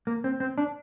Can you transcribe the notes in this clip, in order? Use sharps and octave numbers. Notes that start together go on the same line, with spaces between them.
A#3
C4
C4
D4